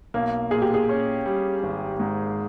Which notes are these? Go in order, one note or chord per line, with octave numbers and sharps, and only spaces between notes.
B1 A#3
A#2 G#4
G4
G#4
C#4
G3
G#1
G#2